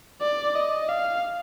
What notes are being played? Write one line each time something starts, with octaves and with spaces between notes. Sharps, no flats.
D5
D#5
F5